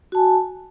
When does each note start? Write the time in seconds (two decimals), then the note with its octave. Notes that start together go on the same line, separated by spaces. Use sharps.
0.12 F#4
0.15 A5
0.17 G#5